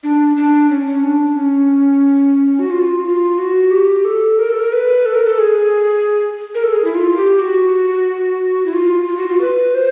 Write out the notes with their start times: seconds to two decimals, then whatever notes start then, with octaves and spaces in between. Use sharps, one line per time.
0.03 D4
0.36 D4
0.70 C#4
0.87 C#4
1.03 D4
1.36 C#4
2.59 F#4
2.70 F4
2.99 F#4
3.05 F4
3.38 F#4
3.71 G4
4.05 A4
4.39 A#4
4.49 A4
4.60 A#4
4.72 B4
5.06 A4
5.15 A#4
5.25 A4
5.38 G#4
6.55 A#4
6.63 A4
6.72 G#4
6.84 E4
6.95 F4
7.17 G4
7.39 F#4
8.66 E4
8.73 F4
9.08 F4
9.17 F#4
9.29 F4
9.41 B4
9.75 C5